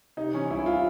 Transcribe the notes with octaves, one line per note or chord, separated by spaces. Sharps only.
C3 D#4
E3 C#4
C2 E4
F4